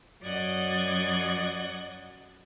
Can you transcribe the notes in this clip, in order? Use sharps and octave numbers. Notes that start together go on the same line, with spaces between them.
F#2 F#3 D5 D#5 F#5 G#6